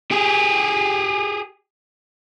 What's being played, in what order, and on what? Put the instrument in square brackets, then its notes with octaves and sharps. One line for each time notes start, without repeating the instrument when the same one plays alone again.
[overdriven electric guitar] G4 G#4